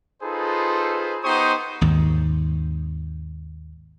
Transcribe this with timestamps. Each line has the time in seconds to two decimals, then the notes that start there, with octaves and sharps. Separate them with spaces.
0.23 D#4 F4 G#4 A4 B4 C5
1.23 B3 D#4 G4 C5 C#6 D#6
1.81 G#1 D#2